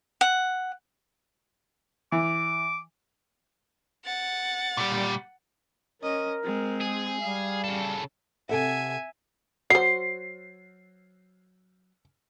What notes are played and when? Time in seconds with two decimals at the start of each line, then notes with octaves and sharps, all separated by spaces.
0.21 F#5
2.12 E3 D6
4.05 F#5 A6
4.77 A#2 G3
6.02 C#4 A#4 D#5
6.44 G#3 C4
6.80 G#4
7.21 G3 F5
7.64 C#3 A4
8.49 C3 A4 E5 F#5 G#5
9.70 F#3 C5 C7